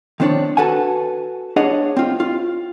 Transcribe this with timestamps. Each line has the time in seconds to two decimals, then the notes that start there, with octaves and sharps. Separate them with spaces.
0.20 D#3 C4 D4 C#5 D5
0.57 F#4 A4 B4 F#5 G#5
1.56 D4 G#4 C#5 D#5 F#5
1.97 C4 F4
2.20 F4